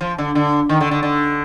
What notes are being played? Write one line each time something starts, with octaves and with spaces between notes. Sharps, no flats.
F3
D3
D3
D#3
D3
D3
D3